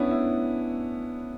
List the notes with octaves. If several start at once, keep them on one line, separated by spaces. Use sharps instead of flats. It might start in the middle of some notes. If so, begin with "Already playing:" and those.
Already playing: B3 C#4 D4 E4
E4